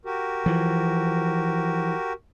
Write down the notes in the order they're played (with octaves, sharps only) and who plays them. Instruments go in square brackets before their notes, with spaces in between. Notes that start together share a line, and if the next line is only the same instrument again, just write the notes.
[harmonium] F#4 G4 A#4
[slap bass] E3 F3